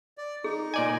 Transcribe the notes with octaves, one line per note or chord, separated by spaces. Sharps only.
D5
D#4 G#4
A#2 D5 D#5 G#5